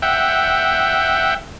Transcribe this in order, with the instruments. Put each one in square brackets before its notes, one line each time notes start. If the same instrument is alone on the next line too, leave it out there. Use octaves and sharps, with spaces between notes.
[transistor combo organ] E5 F#5 G5